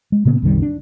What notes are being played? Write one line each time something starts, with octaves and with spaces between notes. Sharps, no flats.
G#3
A#2 C#3 A#3 B3
C2 F#2 D#3 G3
D4